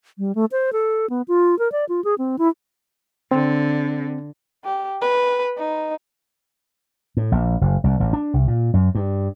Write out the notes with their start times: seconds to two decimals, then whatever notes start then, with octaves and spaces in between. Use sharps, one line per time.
0.18 G3
0.35 A3
0.52 C5
0.73 A4
1.10 B3
1.28 F4
1.59 A#4
1.72 D5
1.89 F4
2.04 G#4
2.18 C4
2.39 E4
3.31 D3 C4
4.65 G4
5.02 B4
5.58 D#4
7.17 A2
7.32 A#1
7.61 F#1
7.84 C2
8.00 A1
8.13 D4
8.33 C2
8.48 A#2
8.74 F#2
8.95 G2